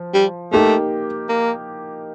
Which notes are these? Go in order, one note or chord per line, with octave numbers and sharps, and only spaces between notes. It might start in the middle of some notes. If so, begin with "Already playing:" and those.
Already playing: F3
G3
A3 A#3 D#4 G4
A#3